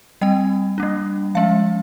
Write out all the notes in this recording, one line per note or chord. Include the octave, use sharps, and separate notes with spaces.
G3 C4 G5
G3 A#3 D4
F3 G#3 C#4 F5